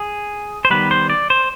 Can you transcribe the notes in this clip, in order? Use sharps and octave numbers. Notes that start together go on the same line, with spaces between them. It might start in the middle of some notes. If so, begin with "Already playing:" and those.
Already playing: G#4
C5
D#3 G3 B3 B4
C5
D5
C5